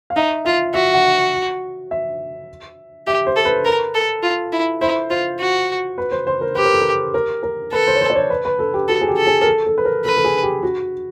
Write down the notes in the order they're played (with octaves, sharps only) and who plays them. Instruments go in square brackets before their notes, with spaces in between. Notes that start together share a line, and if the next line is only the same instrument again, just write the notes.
[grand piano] F5
[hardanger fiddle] D#4 [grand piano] E5
[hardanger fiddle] F4 [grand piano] E5
[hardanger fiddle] F#4 [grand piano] E5
[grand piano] F#5
E5
[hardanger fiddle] G4 [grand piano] E5
[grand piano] C5
[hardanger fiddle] A4
[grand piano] B4
[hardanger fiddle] A#4
A4
F4
E4
[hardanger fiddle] E4 [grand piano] C5
[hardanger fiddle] F4 [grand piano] C5
[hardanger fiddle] F#4
[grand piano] B4
C5
C5
A#4
[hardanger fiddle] G4 [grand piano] B4
[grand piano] A#4
A4
A#4
A#4
A#4
[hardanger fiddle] A4 [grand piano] B4
[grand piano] C5
C#5
C5
D5
C#5
B4
B4
A4
G4
[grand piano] F#4 [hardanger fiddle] A4
[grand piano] G#4
G4
[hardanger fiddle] A4
[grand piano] G#4
A#4
A4
A4
B4
A#4
[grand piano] A4 [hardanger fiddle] B4
[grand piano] A4
G#4
G4
F#4